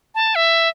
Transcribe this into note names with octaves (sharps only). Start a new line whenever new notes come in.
A5
E5